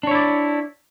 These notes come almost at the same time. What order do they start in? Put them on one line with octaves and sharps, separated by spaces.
D4 C#5 E4 D5